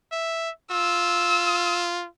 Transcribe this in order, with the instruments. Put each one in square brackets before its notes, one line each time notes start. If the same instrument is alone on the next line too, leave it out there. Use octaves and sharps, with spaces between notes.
[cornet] E5
[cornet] F4 [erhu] E6